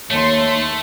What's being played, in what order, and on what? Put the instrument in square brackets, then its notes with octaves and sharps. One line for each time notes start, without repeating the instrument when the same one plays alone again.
[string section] D#2 C6 [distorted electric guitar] A3 [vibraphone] C#5 A5